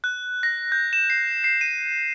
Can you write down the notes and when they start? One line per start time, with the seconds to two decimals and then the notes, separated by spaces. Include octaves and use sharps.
0.04 F#6
0.43 A#6
0.72 G6
0.93 E7
1.10 C7
1.44 C7
1.61 D#7